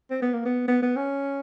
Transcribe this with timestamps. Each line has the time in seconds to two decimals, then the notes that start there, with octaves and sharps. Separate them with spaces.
0.11 C4
0.22 B3
0.34 A#3
0.45 B3
0.68 B3
0.82 B3
0.96 C#4